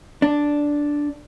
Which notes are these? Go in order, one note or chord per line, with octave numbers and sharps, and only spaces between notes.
D4